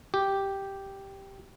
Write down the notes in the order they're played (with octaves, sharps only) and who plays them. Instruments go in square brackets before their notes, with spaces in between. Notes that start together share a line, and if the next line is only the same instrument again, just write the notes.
[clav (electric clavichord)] G4